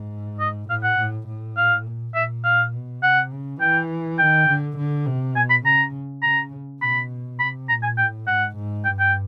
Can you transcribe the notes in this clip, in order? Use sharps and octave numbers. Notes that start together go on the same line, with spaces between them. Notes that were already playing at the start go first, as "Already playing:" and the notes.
Already playing: G#2
D#5
A2 F5
F#5
A2
A2
F5
A#2
A#2 E5
F5
B2
C3 F#5
C#3
E3 G5
D#3 G5
D3
D3
C3
B2 G#5
B5
C#3 A#5
C#3 A#5
B2 B5
C3 B5
A#2 A#5
G#5
A2 G5
G#2 F#5
G#2
G2 G5
G5